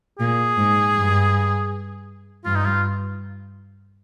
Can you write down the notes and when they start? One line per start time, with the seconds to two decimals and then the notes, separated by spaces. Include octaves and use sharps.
0.19 A#2 G#4
0.56 G#2
0.95 G2
2.45 G2 F4
2.55 D#4
2.66 F4